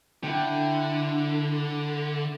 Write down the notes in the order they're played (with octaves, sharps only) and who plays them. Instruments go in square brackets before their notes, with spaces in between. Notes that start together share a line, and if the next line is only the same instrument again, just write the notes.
[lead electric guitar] D3 [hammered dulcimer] E4 G5